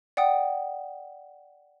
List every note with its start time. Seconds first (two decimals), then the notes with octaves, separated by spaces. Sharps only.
0.17 D5 F#5 G5 D#6